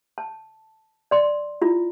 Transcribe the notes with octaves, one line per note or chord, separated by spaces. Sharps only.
A5
D5 C6
E4 F4